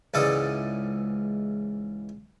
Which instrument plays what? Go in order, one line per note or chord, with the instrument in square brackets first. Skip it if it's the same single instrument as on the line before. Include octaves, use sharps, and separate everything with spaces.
[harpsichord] C#2 G#2 E3 A4 D5 D#6